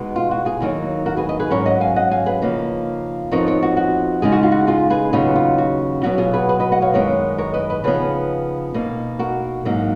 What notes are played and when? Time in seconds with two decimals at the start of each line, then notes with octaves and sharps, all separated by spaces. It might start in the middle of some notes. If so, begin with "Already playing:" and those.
Already playing: B2 G#3 B3 D#4
0.16 F4
0.31 F#4
0.45 F4 G#4
0.60 D#2 D#3 F#3 A#3 D#4
1.06 F#4 A#4
1.17 G#4 B4
1.29 B4 D#5
1.40 G#4 B4
1.50 G#2 F#3 C#4 A#4 C#5
1.66 D#5 F#5
1.81 F5 G#5
1.96 D#5 F#5
2.11 F5 G#5
2.26 G#4 B4
2.42 C#3 F3 A#3 D#4
3.31 F2 F3 B3 D#4 A#4 C#5
3.47 A#4 C#5
3.62 F#4
3.77 F#4
4.22 C#3 G#3 D#4 G#4
4.32 F#4
4.43 F4
4.52 F#4
4.67 F4 G#4
4.90 G#4 B4
5.13 D#2 C#3 F#3 B3 D#4 F4 G#4
5.36 F4
5.58 F#4
6.03 B2 F#3 B3 F#4
6.18 F4 G#4
6.33 G#4 B4
6.49 G#4 B4
6.60 B4 D#5
6.72 D#5 F#5
6.82 C#5 F5
6.94 F#2 D#3 G#3 B3 A#4 C#5
7.38 A#4 C#5
7.54 B4 D#5
7.70 B4 D#5
7.84 C#3 F3 B3 D#4 G#4 B4
8.74 B2 A#3 D#4
9.19 F#4 A#4
9.65 G#2 F#3 A#3 D#4